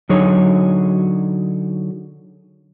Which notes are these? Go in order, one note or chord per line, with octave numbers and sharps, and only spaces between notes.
D3 F#3 D#4 G#4 C#5